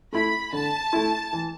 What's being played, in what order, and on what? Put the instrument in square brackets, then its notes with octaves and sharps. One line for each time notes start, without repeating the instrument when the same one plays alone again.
[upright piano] A3 E4 [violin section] B5
[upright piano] D3 [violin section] A5
[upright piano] A3 E4
E3